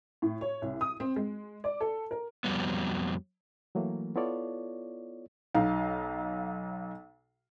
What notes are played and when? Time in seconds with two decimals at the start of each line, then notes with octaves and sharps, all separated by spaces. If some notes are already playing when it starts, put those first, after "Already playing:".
0.22 A2
0.41 C#5
0.62 C2
0.81 D#6
1.00 C4
1.16 G#3
1.64 D5
1.81 A4
2.11 A#4
2.44 F2 B2 F#3 G3 B3
3.75 E3 F#3 A3 A#3
4.16 B3 E4 F4 A4 C#5 D5
5.55 B1 D#4 F5